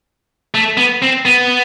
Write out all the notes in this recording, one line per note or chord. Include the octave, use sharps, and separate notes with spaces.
A3
B3
C4
B3